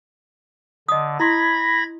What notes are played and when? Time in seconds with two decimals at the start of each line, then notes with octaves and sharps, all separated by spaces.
0.89 D3 D#5 D#6
1.20 E4 B5 C6 G#6 A#6